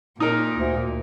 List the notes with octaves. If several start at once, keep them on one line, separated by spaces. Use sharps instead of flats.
A#2 D#4 A#4
D2